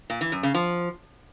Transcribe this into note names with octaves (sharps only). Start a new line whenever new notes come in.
A#2
E3
F#2
C#3
F3